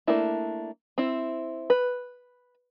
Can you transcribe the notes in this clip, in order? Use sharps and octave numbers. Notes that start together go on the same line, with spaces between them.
A3 A#3 D4 E4
C4 E4
B4